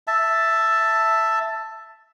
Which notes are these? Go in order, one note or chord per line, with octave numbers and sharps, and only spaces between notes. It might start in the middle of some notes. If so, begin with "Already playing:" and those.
E5 A5